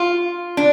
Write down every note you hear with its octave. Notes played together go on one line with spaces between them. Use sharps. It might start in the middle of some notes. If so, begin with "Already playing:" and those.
Already playing: F4
D4